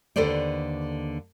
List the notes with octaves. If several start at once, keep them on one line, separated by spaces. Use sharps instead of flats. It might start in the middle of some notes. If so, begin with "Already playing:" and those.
D#2 D3 A4 B4 C5 D5